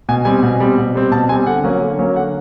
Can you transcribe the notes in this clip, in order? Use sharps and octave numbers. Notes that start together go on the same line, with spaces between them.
B2 G#5
G3 C4 G#5
B2
G3 C4
B2
G3 C4
B2 A5
G3 C4 G#5
D3 F#5
F#3 A#3 C#4
D3
F#3 A#3 C#4
D3 F#5